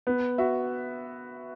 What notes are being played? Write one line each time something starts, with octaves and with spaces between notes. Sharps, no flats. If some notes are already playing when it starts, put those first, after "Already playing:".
B3
F#4 E5